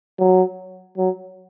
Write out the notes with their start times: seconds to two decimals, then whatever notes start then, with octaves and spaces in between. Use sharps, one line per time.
0.19 F#3
0.98 F#3